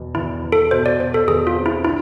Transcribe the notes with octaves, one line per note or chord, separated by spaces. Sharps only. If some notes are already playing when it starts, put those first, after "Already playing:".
Already playing: E2 B2
E2 E4
E2
A4
B2 C5
D5
B2 C5
A4
E2 G#4
F4
C4
E4
D3 E4